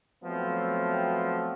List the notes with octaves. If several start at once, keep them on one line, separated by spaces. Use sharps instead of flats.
F3 F#3 A3 B3 C4